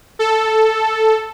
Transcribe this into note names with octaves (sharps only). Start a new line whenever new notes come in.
A4